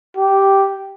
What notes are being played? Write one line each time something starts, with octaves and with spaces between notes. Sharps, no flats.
G4